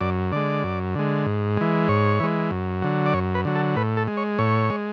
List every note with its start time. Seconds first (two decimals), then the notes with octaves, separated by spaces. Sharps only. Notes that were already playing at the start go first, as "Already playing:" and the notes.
0.01 F#2 D5
0.32 D3 G#3 D5
0.64 F#2
0.95 D3 G#3
1.26 G#2
1.57 E3 G#3
1.88 G#2 C#5
2.20 E3 G#3
2.51 F#2
2.82 D3 F#3
3.06 D5
3.13 F#2 C#5
3.35 B4
3.45 D3 F#3
3.55 A4
3.76 A2 B4
3.97 A4
4.07 G#3
4.17 C#5
4.39 A2 C#5
4.70 G#3